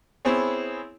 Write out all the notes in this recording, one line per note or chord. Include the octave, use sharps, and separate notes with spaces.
B3 C4 E4 G#4 C#5